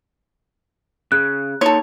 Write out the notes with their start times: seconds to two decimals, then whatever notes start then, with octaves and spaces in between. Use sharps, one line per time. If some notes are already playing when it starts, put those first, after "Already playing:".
1.12 C#3 F#6
1.61 A#3 D#4 A4 C#5 C6